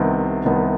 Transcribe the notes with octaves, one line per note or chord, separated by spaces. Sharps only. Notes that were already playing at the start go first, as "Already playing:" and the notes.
Already playing: C2 C3 D#3 B3
C2 C3 D#3 B3